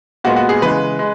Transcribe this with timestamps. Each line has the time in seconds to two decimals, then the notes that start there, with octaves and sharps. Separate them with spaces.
0.24 A#2 G#3 B3 F#4
0.36 F#4
0.49 G#4
0.62 C#3 E3 G#3 B4
0.99 G#3